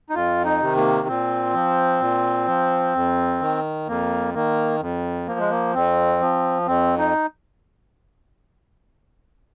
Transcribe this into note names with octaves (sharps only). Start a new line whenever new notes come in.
D#4
F2 F4
D#4
C3 D#3
A#3
A#2 C4
F3
A#2
F3
F2
D#3
F2 A#3
D#3 A#3
F2
F3 A#3
G#3
A#3
F2 C4
F3
F2 C4
D#4